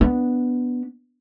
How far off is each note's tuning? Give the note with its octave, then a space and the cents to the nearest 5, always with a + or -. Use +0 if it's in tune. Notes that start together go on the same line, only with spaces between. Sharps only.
B3 +0 D4 +0